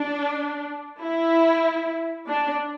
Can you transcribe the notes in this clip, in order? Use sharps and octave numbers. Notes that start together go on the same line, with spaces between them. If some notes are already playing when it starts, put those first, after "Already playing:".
Already playing: D4
E4
D4